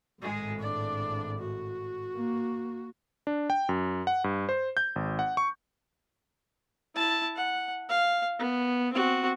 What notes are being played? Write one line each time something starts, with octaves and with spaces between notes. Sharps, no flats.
G#1 A2 G#3 G#4
D4 D5
F#4
A#3
D4
G5
F#2
F#5
G2
C5
G6
G#1
F#5
C#6
E4 A5
F#5
F5
B3
C4 F#4